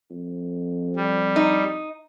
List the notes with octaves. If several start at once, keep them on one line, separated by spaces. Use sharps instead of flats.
F2
G3
D#4